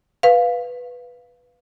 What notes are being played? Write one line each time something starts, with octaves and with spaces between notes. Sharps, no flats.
B4 F5